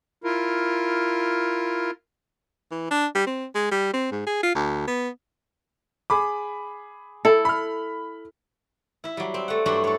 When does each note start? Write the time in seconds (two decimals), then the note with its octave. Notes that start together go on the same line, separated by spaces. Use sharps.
0.24 E4 F4 A#4
2.71 E3
2.91 D4
3.15 G3
3.26 C4
3.55 G#3
3.71 G3
3.93 C4
4.12 G#2
4.26 G#4
4.43 F4
4.55 D2
4.88 B3
6.10 G#4 B5 D6
7.25 E4 A4
7.45 B5 F6
9.04 E4 E5
9.17 F#3 G3
9.34 C4
9.48 A3 F#5
9.66 G2 F#3 D4 F#4 G4 C5
9.84 A4 C#5